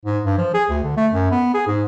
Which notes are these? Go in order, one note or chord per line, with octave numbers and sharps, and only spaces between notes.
G#2
G2
F3
G#4
D2
D3
A3
F#2
B3
G#4
G#2